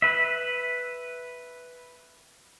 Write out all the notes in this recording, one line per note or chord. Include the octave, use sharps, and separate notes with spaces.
B4 E5